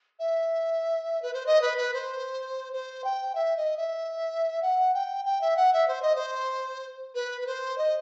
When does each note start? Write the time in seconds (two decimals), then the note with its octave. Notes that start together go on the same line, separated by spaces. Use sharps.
0.19 E5
1.22 B4
1.33 C5
1.46 D#5
1.61 B4
1.77 B4
1.94 C5
2.73 C5
3.04 G5
3.35 E5
3.57 D#5
3.77 E5
4.62 F#5
4.94 G5
5.25 G5
5.41 E5
5.56 F#5
5.73 E5
5.88 C5
6.02 D#5
6.15 C5
7.14 B4
7.41 B4
7.46 C5
7.78 D#5